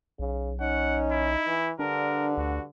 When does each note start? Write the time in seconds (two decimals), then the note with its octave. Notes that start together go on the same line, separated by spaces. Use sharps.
0.19 B1 C#3
0.61 C#4 D#4 F#5
1.12 E4
1.47 E3
1.79 G2 D3 D4 A#4
2.37 D2 F#4